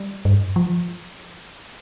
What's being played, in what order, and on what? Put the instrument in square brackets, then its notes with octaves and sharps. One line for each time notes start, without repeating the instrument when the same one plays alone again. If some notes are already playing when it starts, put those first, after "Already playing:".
Already playing: [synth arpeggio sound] G3
[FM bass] G2
F3